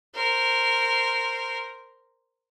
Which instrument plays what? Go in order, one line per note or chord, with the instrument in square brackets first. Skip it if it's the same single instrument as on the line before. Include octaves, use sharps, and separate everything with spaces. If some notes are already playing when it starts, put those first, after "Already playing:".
[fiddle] A#4 C5